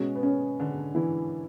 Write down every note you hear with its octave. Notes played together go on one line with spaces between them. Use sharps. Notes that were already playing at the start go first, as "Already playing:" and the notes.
Already playing: B2 G#3 C#4
B3
C#4
D3 D4
E3 E4